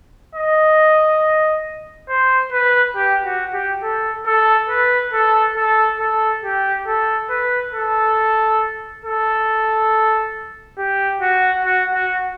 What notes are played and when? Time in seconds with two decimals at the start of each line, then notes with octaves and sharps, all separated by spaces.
0.35 D#5
2.09 C5
2.52 B4
2.96 G4
3.25 F#4
3.53 G4
3.82 A4
4.26 A4
4.69 B4
5.13 A4
5.56 A4
6.00 A4
6.43 G4
6.87 A4
7.30 B4
7.73 A4
9.04 A4
10.78 G4
11.21 F#4
11.65 F#4
11.94 F#4